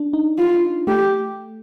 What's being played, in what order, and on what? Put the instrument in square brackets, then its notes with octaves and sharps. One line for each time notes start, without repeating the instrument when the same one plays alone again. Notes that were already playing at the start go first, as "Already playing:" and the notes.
Already playing: [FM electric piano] D4
D#4
[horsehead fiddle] F4
[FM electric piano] A3 [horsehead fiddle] G4